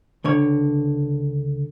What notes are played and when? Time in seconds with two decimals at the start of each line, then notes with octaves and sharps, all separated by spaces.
0.24 C#2 D3 C#5